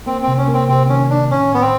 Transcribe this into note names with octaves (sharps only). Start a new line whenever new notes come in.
A#3 C4
C4
C3
C#4
A#3
C4
C3 C4
D#3 C#4
D#3 D4
A2 C#4
A2 B3
C4